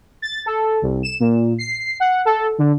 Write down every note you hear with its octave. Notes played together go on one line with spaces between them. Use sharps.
A6
A4
C2
E7
A#2
C7
F#5
A4
D3